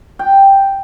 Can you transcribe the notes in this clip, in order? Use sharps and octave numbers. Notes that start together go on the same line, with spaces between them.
G5